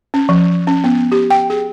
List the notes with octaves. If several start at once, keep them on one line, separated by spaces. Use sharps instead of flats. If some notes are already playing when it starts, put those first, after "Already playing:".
C#4
F3
C#4
B3
G4
G5
G#4